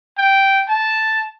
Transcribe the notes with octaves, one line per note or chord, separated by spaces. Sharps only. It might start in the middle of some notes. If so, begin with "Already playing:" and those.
G5
A5